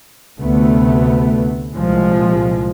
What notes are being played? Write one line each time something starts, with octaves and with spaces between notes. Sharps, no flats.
D2 C3 A3 B3
C2 A#2 F3 G#3